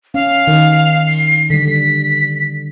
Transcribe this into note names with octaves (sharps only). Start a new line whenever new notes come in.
C#4 F5
D#3
C7
D3 G3 B6